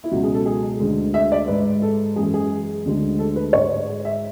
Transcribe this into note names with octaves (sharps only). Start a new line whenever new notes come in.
E4
C#2 B2 F#3 F#4
G#4
A4
G#4
D2 D3 G#3
E5
D5
G#2 G#3 B4
A4
F#2 E3 G#3 G#4
G#4
D2 D3 G#3
A4
B4
G#2 G#3 C#5
E5